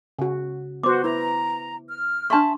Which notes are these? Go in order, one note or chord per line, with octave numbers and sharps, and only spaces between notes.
C#3 F#4
B3 F#4 C5 D6
E4 B4 A#5
F6
D4 E5 A5 C6 C#6